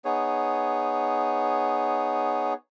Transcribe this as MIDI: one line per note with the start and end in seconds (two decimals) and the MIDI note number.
0.05 2.54 59
0.05 2.54 63
0.05 2.54 68
0.05 2.54 73